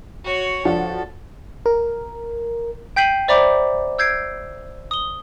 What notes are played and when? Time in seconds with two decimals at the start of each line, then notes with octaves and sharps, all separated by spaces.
0.24 F#4 C#5
0.65 F3 D4 F#4 A4
1.66 A#4
2.96 G5 G6 B6 C7 D#7 F#7
3.28 C5 D5 E5 A#5 B5 D6
3.99 E6 G6 G#6 C7 D7
4.91 D#6 G7